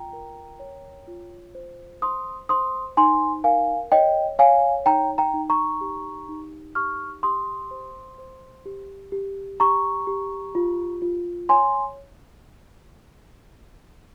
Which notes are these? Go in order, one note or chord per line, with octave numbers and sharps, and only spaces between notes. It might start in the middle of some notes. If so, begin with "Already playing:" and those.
Already playing: F4 G5 A#5
A#4
C#5
F4
C5
C5 C6 D#6
C5 C6 D#6
D#4 G#5 C6
A#4 F5 G#5
C#5 D#5 G5
C#5 F5 G#5
D#4 G5 A#5
G5 A#5
D#4
A#5 C#6
G4
D#4
G4 C#6 F6
G4 C6 D#6
C5
C5
G4
G4
G4 A#5 C#6
G4
F4
F4
C#5 G#5 C6